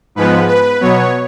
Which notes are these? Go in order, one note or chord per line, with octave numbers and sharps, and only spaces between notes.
G#2 F3 G#3 B3 B4
B4
B2 F#3 B3 C#5